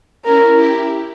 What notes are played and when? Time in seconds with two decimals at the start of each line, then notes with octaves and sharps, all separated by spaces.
0.25 C#4 E4 A#4
0.55 E4 G4